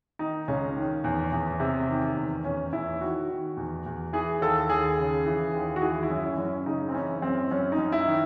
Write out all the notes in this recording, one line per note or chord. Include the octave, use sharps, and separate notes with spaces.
D#3 D#4
C#2 C#4
D#3
E2
E2
C3
D#3
E2
E2 C#4
E2 E4
D#3 F#4
D#3
E2
E2
E3 G#4
D#2 A4
D#2 G#4
C#3
E3
D#2
F#4
E3 G#4
E4
F#2
C#4
F#2
C#4
C#3 D#4
C4
E3 C#4
F#2 C4
F#2 C#4
D#4
F#2
E4
D#3